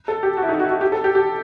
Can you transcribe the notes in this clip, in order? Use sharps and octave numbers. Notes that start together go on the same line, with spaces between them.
A4
G4
F#4
E4
D#4
F#4
F#4
G4
A4
G4
G4